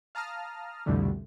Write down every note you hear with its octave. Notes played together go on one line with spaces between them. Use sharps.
F5 A5 A#5 D#6 F6
C2 F2 B2 D3 G3 A3